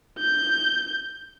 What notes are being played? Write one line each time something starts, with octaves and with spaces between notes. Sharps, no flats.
G6